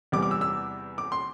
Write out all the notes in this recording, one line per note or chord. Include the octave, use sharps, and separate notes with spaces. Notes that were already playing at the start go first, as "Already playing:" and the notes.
E2 C3 E3 G3 D6
D6
E6
E6
D6
C6